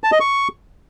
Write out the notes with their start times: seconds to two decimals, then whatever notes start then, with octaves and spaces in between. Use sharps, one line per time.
0.04 A5
0.12 D#5
0.20 C#6